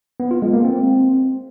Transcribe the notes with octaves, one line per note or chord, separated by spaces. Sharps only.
B3
F4
G#3
A#3
C4